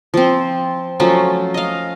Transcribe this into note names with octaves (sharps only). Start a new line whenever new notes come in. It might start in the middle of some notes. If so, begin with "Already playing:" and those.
F3 C4
F3 F#3 A3 C#4
D#5 F5